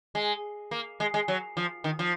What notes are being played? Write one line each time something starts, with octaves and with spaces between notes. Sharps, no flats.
G#3
A#3
G#3
G#3
F#3
F3
D#3
F3